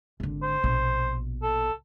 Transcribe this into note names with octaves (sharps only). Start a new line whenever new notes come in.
G#1 D3
C5
A#1 B2
A4